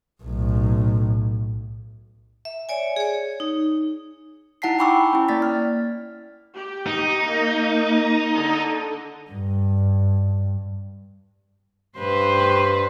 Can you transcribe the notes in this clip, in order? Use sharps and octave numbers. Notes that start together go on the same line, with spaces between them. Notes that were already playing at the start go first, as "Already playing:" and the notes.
B1 A2
E5
C#5 D5 G#5
G#4 C#5
D#4
D#4 E4 F#5 A5 B6 C7
G5 G#5 B5 C#6 D6 E6
C#4 E4
A#3 D5 A6 B6
F6
G4
D#4
A#3
D3
G2
G2 B4 C5